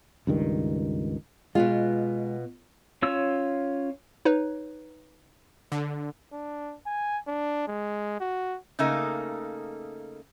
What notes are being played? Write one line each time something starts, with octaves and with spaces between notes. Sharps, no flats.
C#2 G2 D#3
B2 G#3 B3 F4
C#4 F4 C#5 E6
D#4 B4 C#5
D3
D4
G#5
D4
G#3
F#4
C#3 A3 A#3 D#4